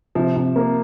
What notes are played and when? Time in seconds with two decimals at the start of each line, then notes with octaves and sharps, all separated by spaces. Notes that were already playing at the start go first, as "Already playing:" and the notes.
0.15 C3 F3
0.36 C3
0.56 A#3